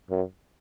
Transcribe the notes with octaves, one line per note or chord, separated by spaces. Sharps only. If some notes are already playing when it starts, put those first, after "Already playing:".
F#2